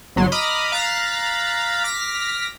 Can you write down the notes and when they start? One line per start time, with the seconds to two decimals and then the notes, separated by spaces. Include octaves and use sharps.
0.16 G1 F#3 C6
0.32 D#5 A#5 B5 D6 D#6 F6
0.72 F5 A#5 F#6 A6 B6
1.84 D6 F6 A#6 B6